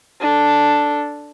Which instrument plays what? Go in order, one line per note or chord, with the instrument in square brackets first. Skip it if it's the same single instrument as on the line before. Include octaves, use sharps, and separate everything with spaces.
[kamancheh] D4 A4